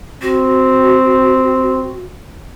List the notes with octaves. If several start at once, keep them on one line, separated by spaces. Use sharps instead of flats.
C4 F#4